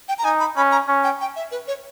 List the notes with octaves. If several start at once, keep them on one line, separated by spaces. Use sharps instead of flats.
G5
A#5
D#4 G#5
B5
C#4 B5
A#5
C#4
G5
G5
E5
B4
C#5